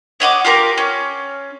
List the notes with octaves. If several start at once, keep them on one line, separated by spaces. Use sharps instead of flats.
C#5 D#5 F#5 D6
F4 G4 A#4 D6
C#4